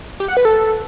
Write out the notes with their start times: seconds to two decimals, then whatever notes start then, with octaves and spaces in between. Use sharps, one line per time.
0.20 G4
0.28 F#5
0.37 B4
0.45 A4